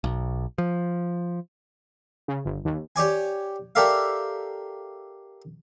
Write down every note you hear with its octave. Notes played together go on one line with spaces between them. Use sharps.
B1
F3
C#3
G1
D#2
G4 C#5 D5 G#5
G4 A4 A#4 D5 E5 F5